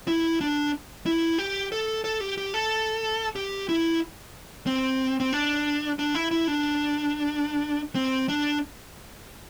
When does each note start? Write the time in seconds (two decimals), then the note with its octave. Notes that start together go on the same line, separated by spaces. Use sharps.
0.08 E4
0.41 D4
1.06 E4
1.38 G4
1.72 A4
2.04 A4
2.21 G4
2.38 G4
2.54 A4
3.36 G4
3.69 E4
4.67 C4
5.20 C4
5.33 D4
5.99 D4
6.15 E4
6.31 E4
6.48 D4
7.95 C4
8.29 D4